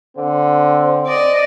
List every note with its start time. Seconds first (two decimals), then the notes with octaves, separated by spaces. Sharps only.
0.17 D3 C4
1.07 D5 D#5